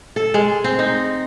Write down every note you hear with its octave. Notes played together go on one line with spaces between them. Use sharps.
A4
G#3
C4
D#4